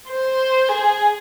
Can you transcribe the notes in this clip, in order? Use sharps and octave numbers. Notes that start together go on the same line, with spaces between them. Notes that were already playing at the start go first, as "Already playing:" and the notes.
C5
G#4